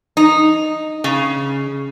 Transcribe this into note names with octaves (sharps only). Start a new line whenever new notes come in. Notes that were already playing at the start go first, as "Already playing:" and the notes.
D#4
C#3